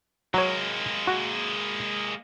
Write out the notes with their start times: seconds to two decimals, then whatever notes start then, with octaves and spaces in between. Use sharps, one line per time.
0.34 F#3 G#3 A#3 C#5
1.07 F#4